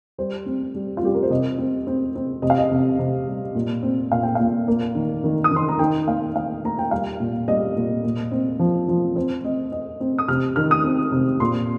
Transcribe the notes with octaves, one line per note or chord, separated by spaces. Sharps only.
G3 C5
C4
G3
F4
G3 G4
A#4
C5
C3 D#5
C4
C4
C4
C3 D#5
F5
D#5
C3
C3
G3
A#2
C4
A#2 F5
G5
A#2 F5
A#3
D#3
D#3
D#6
D#3 C6
A#5
D#3 G5
A#3 F5
A#3 F5
A#3 A#5
G5
G3 F5
A#2
G3 D#5
A#2
A#2
C4
F3
F3
C4 C5
C4 D#5
C4 D#5
C4
D#6
C3 F6
D#3 F6
D#6
C4
C3
A#2 C6